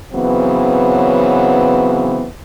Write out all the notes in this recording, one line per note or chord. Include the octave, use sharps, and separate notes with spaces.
C#3 E3 F#3 B3 C4